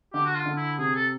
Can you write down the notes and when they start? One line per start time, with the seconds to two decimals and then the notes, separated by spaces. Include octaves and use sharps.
0.13 D3 G4
0.26 F#4
0.35 F4
0.46 D3
0.56 E4
0.79 C3 G#4
0.95 A4